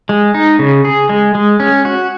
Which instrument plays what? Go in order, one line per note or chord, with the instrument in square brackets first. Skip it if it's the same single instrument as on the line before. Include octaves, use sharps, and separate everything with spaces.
[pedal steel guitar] G#3
D#4
C#3
G#4
G#3
G#3
C#4
F#4